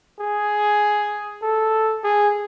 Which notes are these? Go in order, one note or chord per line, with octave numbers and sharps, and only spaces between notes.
G#4
A4
G#4